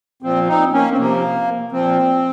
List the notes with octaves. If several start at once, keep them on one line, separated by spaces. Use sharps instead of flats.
A#2 F3 C4
C4 D#4
A#3 C#4
C4
C3 F3 A#3
A#2 F3 C4